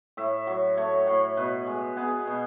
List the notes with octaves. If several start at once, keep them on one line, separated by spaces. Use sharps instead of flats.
A2 E5
F#3
A3 C#5
A2
B2 B4
G#3
B3 G#4
B2